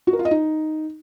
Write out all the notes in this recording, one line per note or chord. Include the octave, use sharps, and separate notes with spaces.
F#4
A#4
F4
D#5
D#4